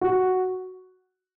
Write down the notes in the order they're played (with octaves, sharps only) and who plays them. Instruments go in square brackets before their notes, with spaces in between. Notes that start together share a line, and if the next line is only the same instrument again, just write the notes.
[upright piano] F#4